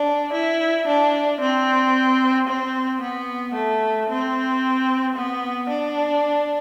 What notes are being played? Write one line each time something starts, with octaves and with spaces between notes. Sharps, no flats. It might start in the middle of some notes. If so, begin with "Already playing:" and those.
Already playing: D4
E4
D4
C4
C4
B3
A3
C4
B3
D4